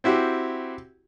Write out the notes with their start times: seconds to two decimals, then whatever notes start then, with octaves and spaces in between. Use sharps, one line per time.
0.04 C4 E4 F#4 G4